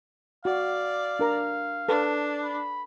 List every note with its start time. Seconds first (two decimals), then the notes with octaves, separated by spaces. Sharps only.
0.45 F#4 D5 F5
1.19 D4 A#4 A#5
1.88 D4 A4 B4
2.43 B5